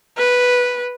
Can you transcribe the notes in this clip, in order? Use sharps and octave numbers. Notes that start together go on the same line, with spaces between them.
B4